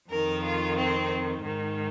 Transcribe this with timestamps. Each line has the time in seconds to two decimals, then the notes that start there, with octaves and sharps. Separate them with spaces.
0.11 F2 D#3 A#4
0.43 F4
0.77 C4
1.42 G#2 D#3